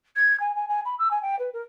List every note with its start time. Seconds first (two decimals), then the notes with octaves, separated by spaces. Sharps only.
0.16 G#6
0.40 G#5
0.55 G#5
0.68 G#5
0.85 B5
0.98 E6
1.10 G#5
1.22 G5
1.39 B4
1.53 A#4